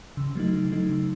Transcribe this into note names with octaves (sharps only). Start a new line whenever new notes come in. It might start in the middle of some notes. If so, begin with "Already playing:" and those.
C#3
F#3 A3 D#4
C#3
F#3 A3 D#4
C#3